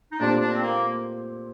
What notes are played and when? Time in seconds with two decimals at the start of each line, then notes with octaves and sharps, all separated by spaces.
0.12 D#4
0.20 A#2 A3 C4 D4 G4
0.40 D4
0.51 C4
0.62 A#3